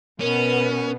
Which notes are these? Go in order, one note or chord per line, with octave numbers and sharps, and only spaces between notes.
B2 B3 C#4 A#4